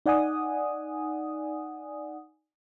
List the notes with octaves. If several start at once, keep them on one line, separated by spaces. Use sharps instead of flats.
D#4 D5 F#5 G#5 D#6